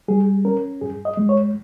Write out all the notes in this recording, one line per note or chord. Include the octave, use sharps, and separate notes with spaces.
G3 G#4
C#4 A#4
G2 G#4
D#5
G#3
C#5